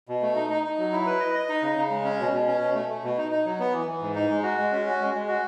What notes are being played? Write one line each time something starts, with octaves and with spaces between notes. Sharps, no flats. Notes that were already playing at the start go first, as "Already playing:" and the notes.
B2
A3
D#4
D#4
D#4
F#3
E4
B4
D#5
D#5
D#4
C#3
C#3
G#3
C#4
B2
B2
C#4
B2
A3
A3
B2
D#4
D#4
F#3
B3
E3
E3
G#2
D#4
G#3
F#4
G#3
C#4
F#4
G#3
G#3
F#4